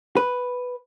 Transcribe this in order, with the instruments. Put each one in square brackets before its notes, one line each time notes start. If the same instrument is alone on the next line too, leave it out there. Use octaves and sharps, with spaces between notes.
[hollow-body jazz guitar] B4